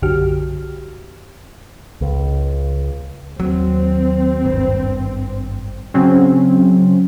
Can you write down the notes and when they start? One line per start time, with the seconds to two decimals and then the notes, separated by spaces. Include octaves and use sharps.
0.02 B1 F#2 D3 F#4 G4 F6
2.01 C#2
3.40 D#2 F#3 C4
4.45 G#1 G2
5.94 C#3 F#3 C4 C#4